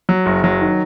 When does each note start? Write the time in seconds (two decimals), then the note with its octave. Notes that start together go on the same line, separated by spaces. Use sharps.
0.09 F#3
0.26 F#1
0.44 F#3
0.61 D#3